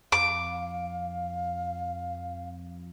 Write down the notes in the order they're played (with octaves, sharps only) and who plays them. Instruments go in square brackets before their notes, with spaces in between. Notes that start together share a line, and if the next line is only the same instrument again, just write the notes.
[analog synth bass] F2 [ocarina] F5 [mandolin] D6